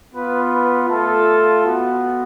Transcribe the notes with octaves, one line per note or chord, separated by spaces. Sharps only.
B3 F4 B4
B4
A3 F4 A4
B3 F#4